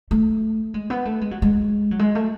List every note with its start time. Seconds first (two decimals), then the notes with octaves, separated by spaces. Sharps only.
0.11 A3
0.74 G#3
0.90 B3
1.05 A3
1.21 G#3
1.31 F#3
1.42 G#3
1.91 F#3
1.99 G#3
2.15 A3